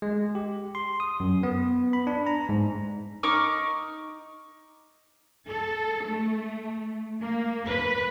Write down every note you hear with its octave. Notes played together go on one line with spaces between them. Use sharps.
G#3
G4
C6
D#6
F#2
B3
B5
D4
A#5
G#2
D#4 C#6 D6 F6
A4
A3
A#3
B4